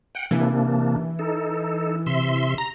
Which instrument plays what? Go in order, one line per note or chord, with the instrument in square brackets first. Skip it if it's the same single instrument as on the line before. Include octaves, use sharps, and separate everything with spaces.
[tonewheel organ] F#5 G5
[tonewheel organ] C3 A#3 D4 [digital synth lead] E3
[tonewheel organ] D#4 A4
C3 E5 C6
[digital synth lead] A#5